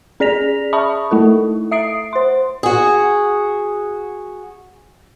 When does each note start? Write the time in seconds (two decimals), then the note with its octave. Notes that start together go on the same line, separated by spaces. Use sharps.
0.20 C#4 G#4 D5 A#6 B6 F7
0.73 E5 A5 B5 C#6 D#6
1.11 A3 E4 A4
1.71 E5 D#6 C7 D7
2.13 C5 C6
2.63 F#4 G#4